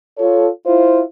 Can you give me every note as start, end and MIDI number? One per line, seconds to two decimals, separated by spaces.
0.18 0.48 65
0.18 0.48 69
0.18 0.48 73
0.66 1.01 64
0.66 1.01 65
0.66 1.01 72